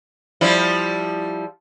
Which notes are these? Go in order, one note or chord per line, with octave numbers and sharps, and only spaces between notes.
F3 G3 E4